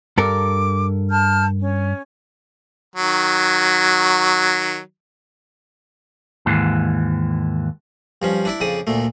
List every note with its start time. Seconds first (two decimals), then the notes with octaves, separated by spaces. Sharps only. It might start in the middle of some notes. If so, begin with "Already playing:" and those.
0.18 G2 A4 A#4 D6
1.11 A5 F6 G6
1.59 C#4
2.96 D#3 F#3
6.46 D#2 G#2 E3
8.22 G2 F3 C#4
8.45 D4 E4 D5
8.60 F2 C#3 D5 D#6
8.87 D2 A#2 A3